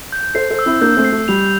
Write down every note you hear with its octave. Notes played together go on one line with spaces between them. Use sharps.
G6
A4 C5 C7
A4 C5
E6
C4 E4
A#3 D4 G6
A3 C4
C7
A3
G3 F7